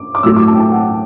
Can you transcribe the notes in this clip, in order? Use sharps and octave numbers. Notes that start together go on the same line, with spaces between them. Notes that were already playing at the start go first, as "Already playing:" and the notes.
Already playing: D6
D6
A2 F#3 A3 E6
D6
A5
G5
A5
F#5